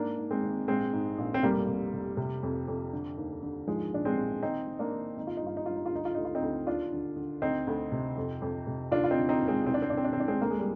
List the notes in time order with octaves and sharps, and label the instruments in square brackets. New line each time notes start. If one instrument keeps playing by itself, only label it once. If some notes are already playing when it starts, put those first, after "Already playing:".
Already playing: [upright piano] G#2 A#3 D4
G#2
G#3 C4
G#1
A#1 G#3 C4
G#2
A#1
C4
F1 G3 A#3
F1
F1
C3
F2
F2
D3
D#2
D3
G#2 F3 G#3
A#1 D4
G#3 C4
A#1
D#3 C4 D#4
D#3
A#3 D4
D#3
G#1 D#4
F4
D#4
G2 F4
D#4
G2 F4
D#4
F4
D2 D#4
F4
D2 D#4
F4
C4 D#4
D2
D#2 D4 F4
D3
D3
D2 C4 D#4
D2
C3
F2
F2
C3
D#2 D4 F4
F4
C4 D#4
D3
C4 D#4
D#2
G#3 C4
C2 C4
D4
C4
C2 D4
C4
D4
C4
C2 D4
G#3 C4
D2 A#3
G#3
G3